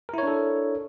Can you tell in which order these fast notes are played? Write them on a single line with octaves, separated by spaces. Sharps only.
A#4 E4 C#5 D4 A4